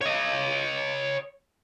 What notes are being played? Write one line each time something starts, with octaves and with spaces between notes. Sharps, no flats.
C#5 D#5